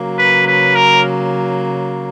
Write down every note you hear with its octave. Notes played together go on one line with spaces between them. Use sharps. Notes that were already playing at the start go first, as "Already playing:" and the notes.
Already playing: C#3 F#3 A#3
B4
B4
A#4